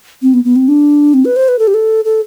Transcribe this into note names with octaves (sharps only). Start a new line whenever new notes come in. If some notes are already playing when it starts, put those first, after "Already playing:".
C4
B3
B3
C4
D4
C4
B4
C5
B4
A4
G4
A4
A4